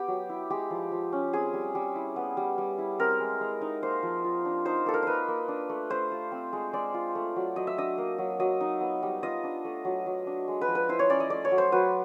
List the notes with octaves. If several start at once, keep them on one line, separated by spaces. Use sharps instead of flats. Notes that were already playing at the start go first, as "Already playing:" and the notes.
Already playing: B3 G4
F#3
E4
G#3 G4
F3
F3
C#4
C4 G#4
G3
G3
E4
B3
G3
G3
E4
C4 A#4
G#3
G#3
D#4
A#3 C5
F3
F4
D4
D#4 C5
A#3 A4
A#4
D#4 B4 C5
A#3
D4
A3
A3 C5
F4
C4
G#3
G#3 D5
F4
A3
F#3
F#3 D#5
E5
D4 D#5
A#3
F#3
F#3 D#5
D#4
B3
G3
F4 D#5
D4
A3
F#3
F#3
D4
G#3
B4
F3
B4
E4 C5
C#5
C#4 D5
D#5
A3 D5
C#5
F#3
C5
F#3 B4